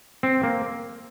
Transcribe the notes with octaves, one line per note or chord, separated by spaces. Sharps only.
C4
A#3